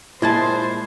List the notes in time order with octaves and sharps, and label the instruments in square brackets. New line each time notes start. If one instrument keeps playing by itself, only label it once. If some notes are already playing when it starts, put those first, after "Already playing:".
[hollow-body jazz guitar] A#2 G#3 A5 [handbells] E4 G#6 [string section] C5